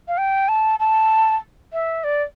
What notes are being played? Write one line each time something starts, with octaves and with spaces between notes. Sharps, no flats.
F5
G5
A5
A5
E5
D5